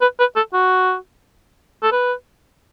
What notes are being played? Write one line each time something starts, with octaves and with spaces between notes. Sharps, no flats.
B4
B4
A4
F#4
A4
B4